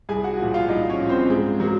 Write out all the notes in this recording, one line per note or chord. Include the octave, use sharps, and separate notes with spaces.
C2 G#4 G#5
F#4 F#5
A#2 F3
F4 F5
C2 D#4 D#5
C#4 C#5
A#2 F3
C4 C5
G#2 G#4
F#3 A#3